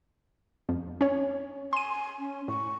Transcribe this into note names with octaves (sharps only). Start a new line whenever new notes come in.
F2
C#4 C#5
G#5 C6 D#7
C#4
A2 C#6